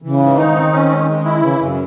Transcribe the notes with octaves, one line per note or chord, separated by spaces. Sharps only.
C#3 E3
G#2
D#3 D#4
C4
C#4
G#3
G#3
E4
C#3 E3
F#2 C#3